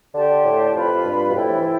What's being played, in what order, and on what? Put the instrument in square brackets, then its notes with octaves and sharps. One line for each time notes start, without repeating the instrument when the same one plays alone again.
[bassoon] D3 [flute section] G4 D5 A5 C6
[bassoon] A2
[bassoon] F2 [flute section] F4 B4 F5 B5
[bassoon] G2
B2
[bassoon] A2 [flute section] E4 A4 C5 G5
[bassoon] E3
E3